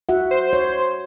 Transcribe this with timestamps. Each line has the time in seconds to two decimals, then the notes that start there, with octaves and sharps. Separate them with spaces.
0.09 F#4 E5 F#5
0.31 C5
0.53 C#5